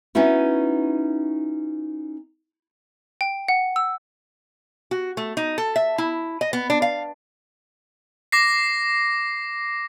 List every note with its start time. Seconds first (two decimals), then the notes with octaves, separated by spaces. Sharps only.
0.15 B3 C#4 D#4 E4 F#4
3.21 G5
3.49 F#5
3.76 E6
4.91 F#4
5.17 A3
5.37 D#4
5.58 A4
5.76 E5
5.98 E4
6.41 D#5
6.53 B3
6.70 D4
6.82 F5
8.32 D6 A#6 C7